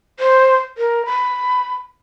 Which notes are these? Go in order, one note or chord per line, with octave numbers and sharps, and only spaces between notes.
C5
A#4
B5